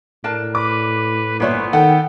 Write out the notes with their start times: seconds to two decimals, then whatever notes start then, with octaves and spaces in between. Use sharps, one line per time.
0.24 A2 D4 A#4 A5
0.55 B4 D6
1.40 G1 A#2 B3 D4 E4 C5 C#5
1.73 D#3 A4 F#5 G5